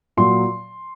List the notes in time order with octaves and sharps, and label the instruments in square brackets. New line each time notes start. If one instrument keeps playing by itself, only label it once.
[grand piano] A#2 F#3 C6